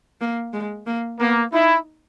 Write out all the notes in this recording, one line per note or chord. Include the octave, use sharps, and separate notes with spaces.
A#3
G#3
A#3
A#3 B3
D#4 E4